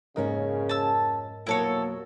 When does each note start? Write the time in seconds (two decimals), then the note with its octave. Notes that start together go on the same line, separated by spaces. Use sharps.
0.16 F2 G#2 C#3 A#3 C#4 A#4 D#5
0.69 A5 E6
1.47 F2 B2 F#3 A#3 E4 A4 C#5